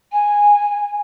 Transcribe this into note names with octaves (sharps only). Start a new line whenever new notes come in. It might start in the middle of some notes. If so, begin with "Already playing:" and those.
G#5